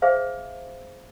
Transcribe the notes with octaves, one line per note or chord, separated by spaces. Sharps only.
G#4 C5 E5 F5